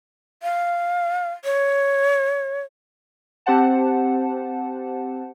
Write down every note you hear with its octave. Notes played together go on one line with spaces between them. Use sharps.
F5
C#5
C4 G4 C5 F#5 A5